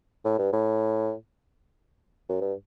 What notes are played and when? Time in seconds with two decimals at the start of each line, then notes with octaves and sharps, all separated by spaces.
0.24 A2
0.38 G2
0.53 A2
2.29 F#2
2.41 G2